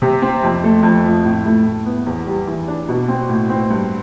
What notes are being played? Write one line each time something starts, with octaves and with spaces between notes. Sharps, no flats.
C3
C4
F2
A3
F2
F3
A2
A3
A2
B3
E2
G3
E3
D4
B2
C4
A2
C4
G2